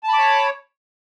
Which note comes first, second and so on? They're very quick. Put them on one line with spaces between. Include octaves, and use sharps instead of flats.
A5 B5 D6 C#5